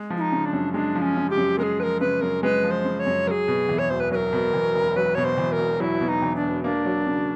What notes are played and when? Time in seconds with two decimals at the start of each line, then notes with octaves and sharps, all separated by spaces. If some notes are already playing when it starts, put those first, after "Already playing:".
Already playing: G#3
0.10 F3
0.17 E4
0.21 D#4
0.32 C#3
0.45 D4
0.53 F#2
0.74 G#3 D4
0.95 F3
1.02 C#4
1.16 C#3
1.30 G4
1.37 F#2
1.59 G#3 A#4
1.63 G#4
1.80 F3 B4
1.83 A#4
2.00 C#3 B4
2.21 F#2 A#4
2.43 G#3 B4
2.63 F3
2.71 C5
2.85 C#3
3.00 C#5
3.06 F#2
3.27 F#3 A#4
3.31 G#4
3.48 B2
3.69 E2
3.79 C#5
3.90 E1 C5
4.00 B4
4.12 F#3 B4
4.15 A#4
4.33 B2
4.54 E2
4.74 E1
4.96 F#3 B4
5.15 B2 C#5
5.24 C5
5.38 E2
5.52 A#4
5.58 E1
5.80 F#3 E4
6.01 B2
6.09 D#4
6.22 E2
6.36 D4
6.43 E1
6.64 A#3 D4
6.85 F#3
7.07 C#3